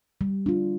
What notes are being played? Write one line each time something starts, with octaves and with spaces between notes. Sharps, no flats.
G3
D4 F4